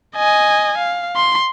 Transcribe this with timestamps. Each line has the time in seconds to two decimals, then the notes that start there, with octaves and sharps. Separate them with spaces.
0.17 D#5 G#5
0.78 F5
1.16 C6